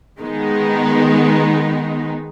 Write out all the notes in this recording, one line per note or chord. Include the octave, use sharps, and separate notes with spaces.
D#3 G#3 B3 D#4